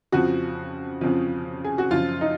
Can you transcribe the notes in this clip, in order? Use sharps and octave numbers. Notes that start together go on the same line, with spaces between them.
F2 C#3 F3 F#4
F2 C#3 F3
G#4
F#4
F#2 C#3 F3 F4
D#4